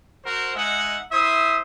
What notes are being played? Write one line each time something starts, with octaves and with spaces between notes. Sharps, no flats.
F#4 A#4 C5
G#3 D#4 E5 F#5
E4 C5 E5 D#6